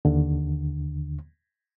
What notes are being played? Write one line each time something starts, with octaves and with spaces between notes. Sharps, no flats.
D#2 D3